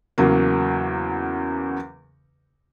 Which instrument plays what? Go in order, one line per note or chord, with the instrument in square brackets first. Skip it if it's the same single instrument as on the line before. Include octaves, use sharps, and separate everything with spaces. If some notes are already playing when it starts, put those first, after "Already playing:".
[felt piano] E2 C#3 F#3 A#3